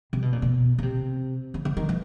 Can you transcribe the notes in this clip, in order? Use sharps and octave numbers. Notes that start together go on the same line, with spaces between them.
C3
B2
A#2
B2
C#3
C3
C#3
D3
D#3
E3